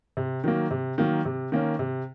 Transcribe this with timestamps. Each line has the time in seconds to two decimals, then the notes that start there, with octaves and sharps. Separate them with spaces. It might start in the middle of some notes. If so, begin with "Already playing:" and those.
0.17 C3
0.44 D#3 F#3 A#3
0.71 C3
0.98 D#3 F#3 A#3
1.25 C3
1.52 D#3 A#3 C#4
1.79 C3